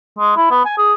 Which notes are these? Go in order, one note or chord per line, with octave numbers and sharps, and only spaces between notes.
G#3
E4
B3
G#5
G#4